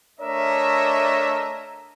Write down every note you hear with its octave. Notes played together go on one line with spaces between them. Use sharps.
A3 D4 A#4 C#5 D#5 E5